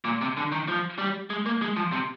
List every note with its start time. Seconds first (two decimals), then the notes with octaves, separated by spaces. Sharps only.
0.05 A#2
0.21 C3
0.37 D3
0.52 D#3
0.68 F3
0.98 G3
1.30 G#3
1.46 A#3
1.62 G#3
1.77 F3
1.92 C3